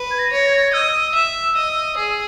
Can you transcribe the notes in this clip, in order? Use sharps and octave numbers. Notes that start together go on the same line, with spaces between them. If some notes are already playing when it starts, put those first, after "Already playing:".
Already playing: B4
G#6
A#6
C#5
G#6
A#6
G#6
D#5 E6
E5
D#5
G#4